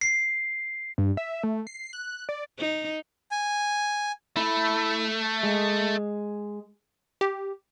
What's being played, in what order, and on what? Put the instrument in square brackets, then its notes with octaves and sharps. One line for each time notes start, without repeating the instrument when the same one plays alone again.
[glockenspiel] C7
[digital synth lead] G2
E5
A3
C7
F#6
D5
[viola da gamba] D#4
[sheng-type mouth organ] G#5
[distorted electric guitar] A3 [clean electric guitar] E4
[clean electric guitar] G#3
[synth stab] G4